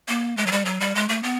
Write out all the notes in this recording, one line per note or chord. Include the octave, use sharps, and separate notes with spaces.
A#3
G#3
F#3
G3
F#3
G3
G#3
A3
B3